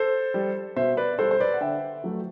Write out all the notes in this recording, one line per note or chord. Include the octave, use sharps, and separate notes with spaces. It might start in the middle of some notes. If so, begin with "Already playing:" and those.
Already playing: A4 C5
G3
B2 C5 E5
B4 D5
G3 A4 C5
C5
B4 D5
F#5
D3 E5 G5
F#3 A3